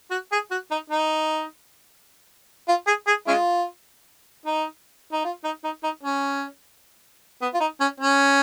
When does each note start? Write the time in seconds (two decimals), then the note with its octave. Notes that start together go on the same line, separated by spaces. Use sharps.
0.11 F#4
0.32 G#4
0.51 F#4
0.71 D#4
0.90 D#4
2.68 F4
2.87 G#4
3.07 G#4
3.27 G#3 C#4 F4
4.46 D#4
5.12 D#4
5.25 F4
5.44 D#4
5.64 D#4
5.83 D#4
6.03 C#4
7.41 B3
7.54 F4
7.60 D#4
7.80 C#4
8.00 C#4